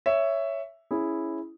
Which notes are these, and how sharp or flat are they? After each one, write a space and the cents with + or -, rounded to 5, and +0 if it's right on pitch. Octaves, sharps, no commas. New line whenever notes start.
C#5 +5 E5 +5
C#4 +0 E4 +0 G#4 +0